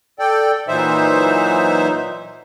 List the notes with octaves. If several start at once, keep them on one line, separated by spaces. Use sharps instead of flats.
A4 D5 G5
A#2 E3 F#3 D#4 C5 E5